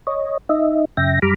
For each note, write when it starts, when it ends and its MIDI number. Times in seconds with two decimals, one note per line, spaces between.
0.07 0.37 73
0.07 0.37 75
0.49 0.85 63
0.49 0.85 75
0.49 0.85 76
0.97 1.19 42
0.97 1.19 49
0.97 1.19 76
0.97 1.19 79
0.97 1.19 94
1.22 1.34 42
1.22 1.34 55
1.22 1.34 82
1.22 1.34 83
1.22 1.34 86
1.22 1.34 89